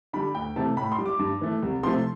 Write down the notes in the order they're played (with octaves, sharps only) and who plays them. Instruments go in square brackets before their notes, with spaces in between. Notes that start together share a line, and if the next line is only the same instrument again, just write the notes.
[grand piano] D3 G3 B5
D2 G5
C3 E3 A3 A5
A2 B5
C6
G3
D6
G2
E3 A3
C2
C3 F3 A3 C6